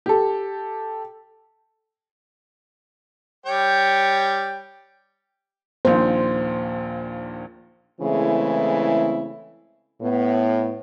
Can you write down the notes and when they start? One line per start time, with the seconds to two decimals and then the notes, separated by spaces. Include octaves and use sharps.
0.06 G4 A4
3.46 G3 C#5 G5
5.85 A#1 D#2 A#2 C5
8.00 C#3 E3 G#3 A3 C4 E4
10.02 A2 B3